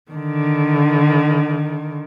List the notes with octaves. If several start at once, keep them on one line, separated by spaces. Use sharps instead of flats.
D3 D#3